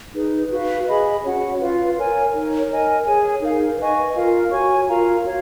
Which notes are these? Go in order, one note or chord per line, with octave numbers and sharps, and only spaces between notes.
D#4 G#4 B4
F#4 B4 F5
G#4 D#5 G#5 B5
C#4 F#4 C#5 F#5
F4 B4 F5
A#4 C#5 G#5
D#4 A#4 C#5
A#4 D#5 G#5
G#4 C#5 G#5
D#4 A#4 F5
B4 D#5 G#5 C#6
F4 A#4 F5
F#4 C#5 G#5 C#6
F4 A#4 F5 A#5
F#4 C#5 F5